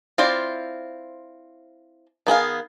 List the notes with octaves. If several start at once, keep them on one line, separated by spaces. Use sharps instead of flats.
C4 E4 F4 C5 D5
D#3 B3 G#4 F5